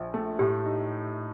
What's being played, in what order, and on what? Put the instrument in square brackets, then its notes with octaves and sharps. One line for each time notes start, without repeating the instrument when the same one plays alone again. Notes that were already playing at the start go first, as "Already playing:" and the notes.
Already playing: [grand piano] A#1 F3
A3
[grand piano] A2 [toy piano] G4
[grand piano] D#4